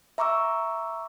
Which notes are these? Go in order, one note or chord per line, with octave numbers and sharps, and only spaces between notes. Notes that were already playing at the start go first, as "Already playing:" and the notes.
E5 A#5 C#6 D6 E6